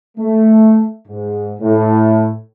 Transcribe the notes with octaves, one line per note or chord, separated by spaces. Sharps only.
A3
G#2
A2